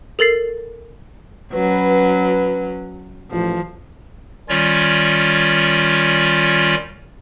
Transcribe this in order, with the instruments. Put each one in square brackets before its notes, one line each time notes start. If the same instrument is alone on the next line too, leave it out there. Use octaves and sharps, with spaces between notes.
[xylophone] A4 A#4 A6 C7
[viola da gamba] F#3 C#4 [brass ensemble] B4
[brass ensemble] A1 [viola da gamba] F3
[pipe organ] D#3 G3 C#4 F4 C#5 D5